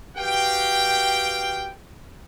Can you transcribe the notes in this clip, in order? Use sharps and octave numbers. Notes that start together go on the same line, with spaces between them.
F#4 G4 B4 F5 G5